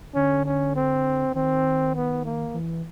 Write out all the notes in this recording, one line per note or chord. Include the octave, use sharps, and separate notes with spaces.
D3 C#4
C#4
C4
D#3 C4
B3
A#3
E3